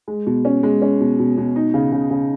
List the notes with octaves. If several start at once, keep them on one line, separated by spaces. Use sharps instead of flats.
G#3
B2
C#4
G#3
C#4
B2
B2
B2
D#4
C#3
C#3
C#3